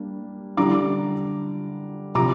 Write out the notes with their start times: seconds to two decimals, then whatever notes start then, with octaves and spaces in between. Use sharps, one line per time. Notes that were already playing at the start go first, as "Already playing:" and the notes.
Already playing: G3 A#3 D4
0.57 D3 G3 D4 A#5 D6
2.15 C3 F3 A#5 D6